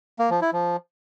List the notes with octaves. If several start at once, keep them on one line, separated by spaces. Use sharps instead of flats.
A#3
F3
E4
F3